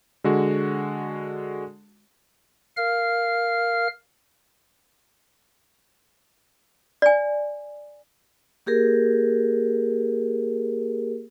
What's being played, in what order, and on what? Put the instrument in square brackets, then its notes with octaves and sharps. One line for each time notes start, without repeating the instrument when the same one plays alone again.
[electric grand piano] D3 G#3 F#4
[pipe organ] A#4 F5 F6
[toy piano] D5 G#5
[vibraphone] A#3 G4 G#4 A#4